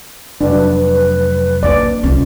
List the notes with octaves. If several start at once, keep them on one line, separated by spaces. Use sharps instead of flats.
F1 F#3 D4 B4
A#3 D4 D5
C2 C#4 F4